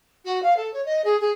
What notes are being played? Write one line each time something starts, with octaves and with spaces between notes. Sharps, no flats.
F#4
F5
A4
C#5
D#5
G#4
G#4